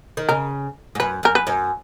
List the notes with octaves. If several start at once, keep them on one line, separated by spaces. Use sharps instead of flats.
D#3
C#3 A#4
G#2
F#2 B4
F#2 A#4
B4
F#2